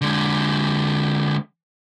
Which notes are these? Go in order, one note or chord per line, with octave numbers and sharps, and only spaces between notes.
D3 G#3